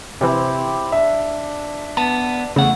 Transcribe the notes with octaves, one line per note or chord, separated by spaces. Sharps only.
C3 E3 C4 E4 G4
D4 E5
B3 A5
E2 A2 C#3 A3 F#5